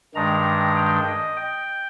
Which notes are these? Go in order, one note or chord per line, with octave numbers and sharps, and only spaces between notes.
G2 D#3 G#3 D4 A#5
G5
D#5
G5